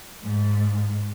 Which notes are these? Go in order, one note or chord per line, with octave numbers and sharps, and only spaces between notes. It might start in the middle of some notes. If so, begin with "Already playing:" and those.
G#2